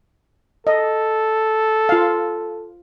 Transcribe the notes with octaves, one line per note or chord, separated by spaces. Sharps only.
A4 D#5
F4 F5